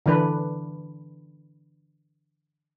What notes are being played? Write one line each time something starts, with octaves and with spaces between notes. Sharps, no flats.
D3 E3 D4 B4